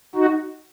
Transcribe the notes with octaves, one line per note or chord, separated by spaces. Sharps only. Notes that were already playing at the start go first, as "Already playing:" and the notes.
D#4 F#4